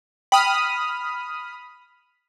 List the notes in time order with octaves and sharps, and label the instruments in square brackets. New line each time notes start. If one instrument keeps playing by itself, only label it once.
[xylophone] G5 [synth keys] B5 D#6 F6